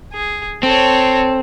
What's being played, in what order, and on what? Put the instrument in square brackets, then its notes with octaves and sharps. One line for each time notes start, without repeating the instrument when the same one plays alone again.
[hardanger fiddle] G#4
[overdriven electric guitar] C4 [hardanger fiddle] A4 C#5